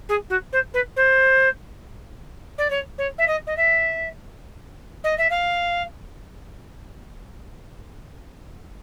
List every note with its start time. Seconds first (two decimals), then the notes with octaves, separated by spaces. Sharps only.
0.09 G#4
0.30 F#4
0.53 C5
0.74 B4
0.96 C5
2.58 D5
2.70 C#5
2.98 C#5
3.18 E5
3.28 D#5
3.47 D#5
3.57 E5
5.04 D#5
5.18 E5
5.30 F5